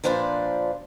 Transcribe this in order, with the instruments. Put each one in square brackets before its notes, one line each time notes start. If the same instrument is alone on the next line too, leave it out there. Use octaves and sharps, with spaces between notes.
[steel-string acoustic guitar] A#2 F3 D4 B4 C5 D5